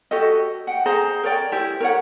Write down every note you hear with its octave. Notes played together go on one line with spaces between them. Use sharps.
F#4 G4 A4 D#5
F#5 G5
G#4 C5 D#5 A#5
A#4 C#5 D5 G5
E4 G4 C5
A#4 C#5 F#5